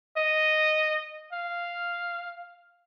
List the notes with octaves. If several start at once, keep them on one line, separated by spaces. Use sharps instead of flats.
D#5
F5